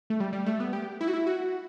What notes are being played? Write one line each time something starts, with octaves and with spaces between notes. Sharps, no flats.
A3
G3
G3
A3
B3
G4
E4
F#4
E4
F#4